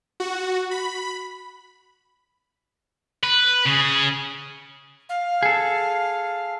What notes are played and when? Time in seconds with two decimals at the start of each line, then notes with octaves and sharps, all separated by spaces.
0.20 F#4
0.71 B5
3.23 B4
3.66 C#3 G#4
5.09 F5
5.43 G#4 A4